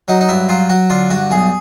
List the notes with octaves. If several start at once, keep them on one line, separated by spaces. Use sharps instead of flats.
F#3 D#4
D#4
G2 E4
F#3 F4
F#3 F#4
D3 F4
G2 F#4
B1 G#4